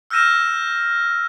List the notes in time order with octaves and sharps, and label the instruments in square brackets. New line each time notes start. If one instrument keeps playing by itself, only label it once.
[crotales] E6 F6 G6 A#6 D#7 E7